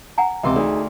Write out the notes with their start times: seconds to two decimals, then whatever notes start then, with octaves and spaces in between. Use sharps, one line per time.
0.18 F#5 G#5 A#5
0.43 C#2 C3 E3 C6 D6
0.56 D2 D#4 G#4